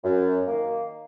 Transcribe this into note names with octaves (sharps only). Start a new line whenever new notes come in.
F#2
D#3 A#3